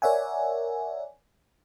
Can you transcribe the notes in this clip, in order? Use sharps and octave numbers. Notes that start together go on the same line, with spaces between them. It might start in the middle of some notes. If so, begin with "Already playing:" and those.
A#4 C#5 D5 E5 F#5 G#5